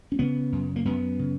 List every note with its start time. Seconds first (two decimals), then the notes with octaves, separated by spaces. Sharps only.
0.12 C#4
0.19 C#3 B3
0.52 F#2
0.76 A#3
0.85 F#2 B3
1.19 C#3